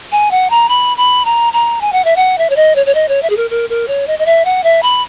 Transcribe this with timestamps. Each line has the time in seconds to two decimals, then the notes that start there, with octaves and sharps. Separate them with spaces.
0.12 G#5
0.31 F#5
0.50 A#5
0.69 B5
0.97 B5
1.25 A#5
1.53 A#5
1.81 G#5
1.92 F#5
2.05 E5
2.16 F#5
2.38 E5
2.50 C#5
2.56 D#5
2.75 C#5
2.86 C#5
2.95 D#5
3.08 C#5
3.22 E5
3.30 G#4
3.37 A#4
3.51 A#4
3.70 A#4
3.88 C#5
4.07 D#5
4.19 D#5
4.26 E5
4.45 F#5
4.63 E5
4.83 B5